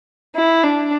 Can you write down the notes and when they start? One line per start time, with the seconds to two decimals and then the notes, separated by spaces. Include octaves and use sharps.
0.35 E4
0.64 D4